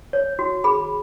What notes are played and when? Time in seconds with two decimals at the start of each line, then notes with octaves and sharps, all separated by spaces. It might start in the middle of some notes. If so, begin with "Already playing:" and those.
0.13 C#5
0.39 F#4
0.64 G#4 B5